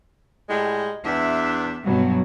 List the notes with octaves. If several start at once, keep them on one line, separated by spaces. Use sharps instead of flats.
A2 G3 G#3
E2 D4 E5
G2 B2 F#3